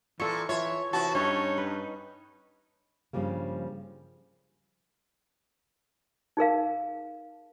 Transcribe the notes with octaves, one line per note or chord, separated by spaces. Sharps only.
A#2 E3 F4 A4 C#6
E3 F4 A4 C#5 E5
C3 E3 F#4 A5
G2 C#4 D#4 C#5 E5
B4
G2 C#3 F3 G3 A#3
D#4 G#4 A#4 F5